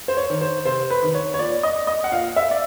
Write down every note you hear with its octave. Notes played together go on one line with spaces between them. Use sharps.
C5
C#5
D#3
C5
C3 C5
B4
D#3
C#5
C#5
A#2 D5
D#5
D#5
F#5
A#2 F5
E5
D5